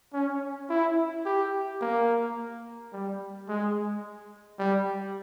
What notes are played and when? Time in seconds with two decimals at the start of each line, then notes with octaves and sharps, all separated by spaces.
0.13 C#4
0.70 E4
1.25 G4
1.81 A#3
2.93 G3
3.48 G#3
4.59 G3